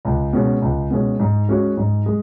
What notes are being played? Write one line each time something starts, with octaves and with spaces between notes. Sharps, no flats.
C#2
B2 G#3 C#4
C#2
B2 G#3 C#4
G#2
G#3 C#4 F#4
G#2
G#3